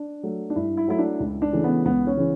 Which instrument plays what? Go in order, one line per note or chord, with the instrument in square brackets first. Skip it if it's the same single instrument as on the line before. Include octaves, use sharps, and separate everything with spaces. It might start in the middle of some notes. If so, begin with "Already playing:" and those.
Already playing: [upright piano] D4
F#3 A3
D4
G2 E4
E4
F#3 A3 E4
D4
C#2
D4
C#3 E3 A3
B3
C#2 B3
C#4
C#3 E3